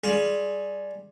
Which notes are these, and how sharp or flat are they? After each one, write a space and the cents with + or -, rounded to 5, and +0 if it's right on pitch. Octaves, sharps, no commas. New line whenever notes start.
G3 +0 F4 +0 G#4 +15